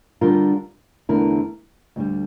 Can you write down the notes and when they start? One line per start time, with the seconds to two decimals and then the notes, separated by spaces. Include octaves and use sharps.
0.21 D3 G3 D4 F4 A#4
1.09 E2 D3 A3 E4 A#4
1.96 D2 D3 G3